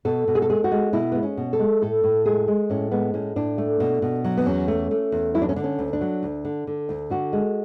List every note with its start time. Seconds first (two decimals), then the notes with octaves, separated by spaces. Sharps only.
0.05 B2 A4
0.28 B2
0.35 G#4
0.42 A4
0.50 G#3 G#4
0.64 F#4
0.72 G#3
0.93 B2 E4
1.12 G#3 B3
1.23 C#4
1.37 B2
1.53 A4
1.59 G#3
1.82 A2 A4
2.04 A2
2.25 G#3 G#4
2.48 G#3
2.70 A2 C#4
2.91 G#3 B3
3.14 A2 C#4
3.36 A2 D4
3.58 A3
3.80 B2
4.02 B2
4.24 F#3
4.37 B3
4.46 E2 C#4
4.68 A3
4.91 A3
5.12 E2
5.34 F#3 E4
5.42 D4
5.49 C#4
5.56 D3 D4
5.64 C#4
5.79 D2
5.93 D4
6.01 F#3
6.23 D2
6.45 D3
6.67 D3
6.89 D2
7.10 D3 F#4
7.33 G#3